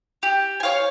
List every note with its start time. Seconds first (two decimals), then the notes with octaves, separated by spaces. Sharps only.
0.23 G4
0.60 G#5
0.63 C#5 F5